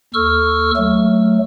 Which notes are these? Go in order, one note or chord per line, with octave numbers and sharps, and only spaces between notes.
D#2 A4 C#6 E6 F6
F#3 A3